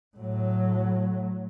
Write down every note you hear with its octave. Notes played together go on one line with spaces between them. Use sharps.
A2 F#3